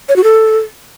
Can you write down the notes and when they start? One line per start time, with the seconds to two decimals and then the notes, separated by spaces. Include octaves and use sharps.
0.09 C#5
0.16 F#4
0.24 A4